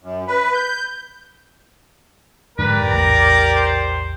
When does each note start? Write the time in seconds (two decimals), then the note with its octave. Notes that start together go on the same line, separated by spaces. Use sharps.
0.03 F#2
0.28 B4
0.54 G6
2.58 F2 G#2 D3 G4 A#4 B4 D5
2.91 A#1 E2 A2 A#5
3.56 C5